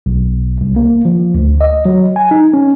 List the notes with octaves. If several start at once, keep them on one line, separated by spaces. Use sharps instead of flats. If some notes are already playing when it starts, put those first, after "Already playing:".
B1
C2
A#3
F3
D2
D#5
F#3
G#5
D#4
C#4